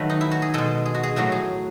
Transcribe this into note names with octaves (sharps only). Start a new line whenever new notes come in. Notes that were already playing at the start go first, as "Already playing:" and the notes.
Already playing: D#3 F#3 A3 B4
D#4
E4
F#4
G#4
B2 G#3 A4
G#4
F#4
G#4
A2 F#3 A3 F#4
G#4